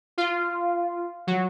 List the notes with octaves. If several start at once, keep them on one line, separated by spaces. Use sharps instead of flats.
F4
F#3